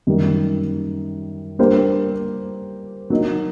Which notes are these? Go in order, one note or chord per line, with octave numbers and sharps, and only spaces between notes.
F#2 D#3 G3 A#3 F#4
G3 A#3 D4 G4 C5
F#3 A#3 D#4